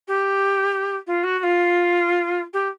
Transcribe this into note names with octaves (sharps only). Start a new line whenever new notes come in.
G4
F4
F#4
F#4
F4
G4